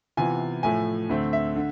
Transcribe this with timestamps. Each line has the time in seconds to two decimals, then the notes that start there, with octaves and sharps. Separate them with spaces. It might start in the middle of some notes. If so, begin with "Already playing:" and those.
0.17 C3 E3 B3 F4 G#5
0.63 A2 F3 A3 G#5
1.09 D2 D3 A3 C4
1.33 E5
1.56 D3